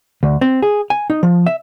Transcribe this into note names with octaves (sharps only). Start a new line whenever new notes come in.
D2
C4
G#4
G#5
D#4
F3
E5